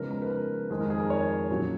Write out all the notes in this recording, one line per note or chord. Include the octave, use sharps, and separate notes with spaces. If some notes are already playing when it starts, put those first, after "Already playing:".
Already playing: C#3 F3 G#3 B3 D#4 A#4
A#4
B4
A#4
F2 D#3 G#3 G#4
A#4
G#4
A#4
C#5
A#2 F#3 A#3 C#4